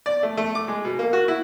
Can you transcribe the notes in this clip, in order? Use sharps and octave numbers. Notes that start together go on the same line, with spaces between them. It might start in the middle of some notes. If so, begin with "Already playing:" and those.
D5
A3
A3
D6
G#3
B2
A#3
F#4
E4